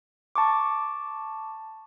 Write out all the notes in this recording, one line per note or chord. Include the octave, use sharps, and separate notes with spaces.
A5 C#6 D6